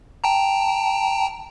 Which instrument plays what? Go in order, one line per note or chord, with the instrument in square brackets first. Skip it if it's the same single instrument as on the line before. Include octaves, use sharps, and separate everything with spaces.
[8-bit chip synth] G5 A5 A#5